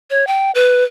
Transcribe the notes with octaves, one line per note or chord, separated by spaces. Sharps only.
C#5
G5
B4